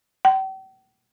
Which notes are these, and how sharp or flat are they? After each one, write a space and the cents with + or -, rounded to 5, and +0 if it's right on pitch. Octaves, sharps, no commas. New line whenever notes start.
G5 -45